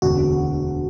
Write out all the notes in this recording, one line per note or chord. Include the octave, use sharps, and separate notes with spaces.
E1 D2 D3 F#4